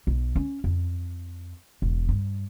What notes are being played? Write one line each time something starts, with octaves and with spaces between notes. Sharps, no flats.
B1
C#4
F2
E1
G2